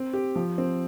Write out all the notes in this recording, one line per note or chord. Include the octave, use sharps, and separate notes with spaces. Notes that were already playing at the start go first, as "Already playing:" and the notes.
Already playing: C4
G4
F3
C4